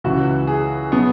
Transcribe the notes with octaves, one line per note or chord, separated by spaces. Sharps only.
C#2 C#3 E3 F#4
G#4
B2 F#3 B3